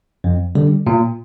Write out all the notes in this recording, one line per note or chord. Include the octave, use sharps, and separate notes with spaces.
F2
D3 G3
A#2